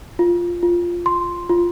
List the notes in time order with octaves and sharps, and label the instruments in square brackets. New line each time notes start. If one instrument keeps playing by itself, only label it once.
[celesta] F4
F4
C6
F4